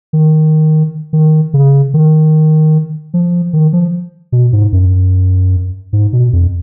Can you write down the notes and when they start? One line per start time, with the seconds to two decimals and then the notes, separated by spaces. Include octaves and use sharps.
0.13 D#3
1.13 D#3
1.54 C#3
1.94 D#3
3.14 F3
3.53 D#3
3.73 F3
4.32 B2
4.53 G#2
4.72 F#2
5.93 G#2
6.13 B2
6.33 F2